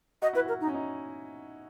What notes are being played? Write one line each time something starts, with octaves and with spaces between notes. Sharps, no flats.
F#4 D#5
E4 B4
F#4 A#4
D#4
C#4
D#4